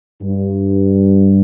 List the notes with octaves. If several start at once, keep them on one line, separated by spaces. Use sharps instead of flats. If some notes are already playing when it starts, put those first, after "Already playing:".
G2